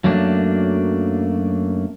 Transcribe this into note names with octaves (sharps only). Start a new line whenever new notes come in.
F#2 F#3 A3 A#3 C4 D4